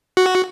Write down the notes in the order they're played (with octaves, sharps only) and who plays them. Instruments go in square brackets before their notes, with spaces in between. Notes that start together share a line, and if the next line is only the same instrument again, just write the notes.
[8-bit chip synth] F#4